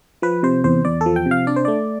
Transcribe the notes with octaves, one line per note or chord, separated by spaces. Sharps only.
F3 B4
C3 C5
E2 C5
E2 D5
A4
F3
G5
C3
F5
D4 D5
C5
A3 D5